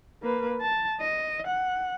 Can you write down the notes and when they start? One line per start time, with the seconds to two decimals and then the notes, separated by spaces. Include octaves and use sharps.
0.23 A#3 B4
0.61 A5
1.00 D#5
1.47 F#5